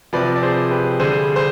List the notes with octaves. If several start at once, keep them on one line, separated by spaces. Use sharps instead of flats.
C3 F3 B4 D5
D5
G#4 C5
G4 B4
D3 G3 G#4 C5
C5